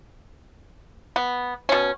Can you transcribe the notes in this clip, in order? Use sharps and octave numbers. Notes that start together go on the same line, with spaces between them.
B3
B2 C#4